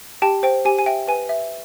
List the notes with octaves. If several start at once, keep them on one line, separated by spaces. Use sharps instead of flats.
G4 G5 A5
C5 G5
G4 G#5
G#5
E5 G5
B4 G#5
E5